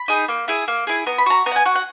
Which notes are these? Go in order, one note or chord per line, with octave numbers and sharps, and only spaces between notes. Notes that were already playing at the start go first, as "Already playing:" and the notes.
Already playing: B5
D#4 G#4
A#3
E4 G#4
A#3
E4 G#4
B3 A#5
B5
F#4 A#5
B3 A#5
F#5
G#5
F#4 F#5
F#5